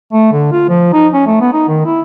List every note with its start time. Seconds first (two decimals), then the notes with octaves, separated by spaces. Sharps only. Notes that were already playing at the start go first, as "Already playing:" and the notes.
0.13 A3
0.32 D3
0.52 F4
0.69 F3
0.93 D#4
1.13 C#4
1.27 A3
1.41 B3
1.53 D#4
1.68 D#3
1.85 E4